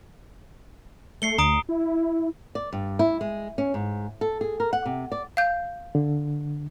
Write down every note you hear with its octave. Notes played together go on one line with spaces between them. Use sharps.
A3 C7 C#7 G7
D2 A#5 D#6 D7
E4
D5
G2
E4
G#3
C#4
G#2
A4
G#4
A#4
F#5
C3
D5
F5 G6
D3